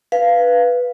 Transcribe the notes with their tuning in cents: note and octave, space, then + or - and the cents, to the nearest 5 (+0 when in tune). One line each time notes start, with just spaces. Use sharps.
B4 +0 F5 -10